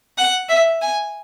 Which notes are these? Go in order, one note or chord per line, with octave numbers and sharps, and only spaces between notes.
F#5
E5
G#5